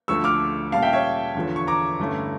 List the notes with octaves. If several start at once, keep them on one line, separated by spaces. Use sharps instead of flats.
D2 D3 F3 A3 C#6 E6
D6 F6
A#2 G3 C#4 F5 A5
E5 G5
C#5 E5
E2 D3 F3
C#6
A#5 D6
G2 D3 A3 C#4 E4